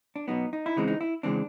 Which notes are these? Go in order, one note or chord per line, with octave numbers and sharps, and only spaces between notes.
D4
B2 F#3 B3 D#4
D#4
E4
C#3 E3 G#3 C4 D#4
D#4
E4
C#3 E3 G#3 C4 D4